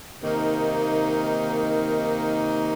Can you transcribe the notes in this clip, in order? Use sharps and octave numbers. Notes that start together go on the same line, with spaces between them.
C3 D#3 A#3 D#4